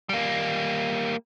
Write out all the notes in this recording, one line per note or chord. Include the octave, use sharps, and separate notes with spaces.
G3 A#3